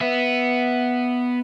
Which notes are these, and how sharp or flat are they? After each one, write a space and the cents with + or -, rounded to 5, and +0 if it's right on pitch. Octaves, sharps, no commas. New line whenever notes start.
B3 +0 E5 +0